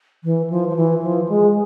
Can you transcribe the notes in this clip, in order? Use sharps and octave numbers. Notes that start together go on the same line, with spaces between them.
E3
F3
F3
E3
F3
G#3